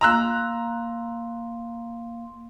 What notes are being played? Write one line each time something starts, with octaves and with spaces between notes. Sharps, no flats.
A#3 F5 A#5 C6 E6 F#6